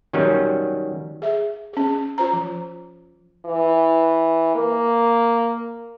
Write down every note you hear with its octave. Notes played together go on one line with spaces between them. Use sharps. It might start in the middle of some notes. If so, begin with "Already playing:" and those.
D#3 F#3 G3 C#4
G#4 E5
C#4 G#4
F4 C5 A#5
F3
E3
A#3